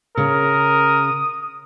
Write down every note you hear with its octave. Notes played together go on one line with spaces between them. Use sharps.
C#3 A#4 D#6